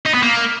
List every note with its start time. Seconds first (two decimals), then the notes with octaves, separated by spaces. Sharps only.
0.06 D#4
0.14 B3
0.23 A#3